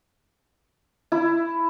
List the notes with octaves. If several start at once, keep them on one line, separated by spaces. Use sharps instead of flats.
E4